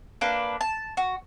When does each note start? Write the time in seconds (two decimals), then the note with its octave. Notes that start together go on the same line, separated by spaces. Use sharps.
0.21 A#3 D4 B4
0.61 A5
0.97 F#4